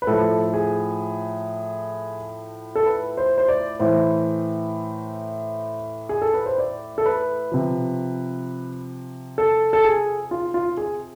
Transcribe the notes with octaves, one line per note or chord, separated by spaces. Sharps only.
B4
A2 F3 A4
G#4
A4
B4
C5
C5
D5
A2 E3 C5
G#4
A4
B4
C5
D5
A4
B4
C3 F3
A4
A4
G#4
F4
F4
G#4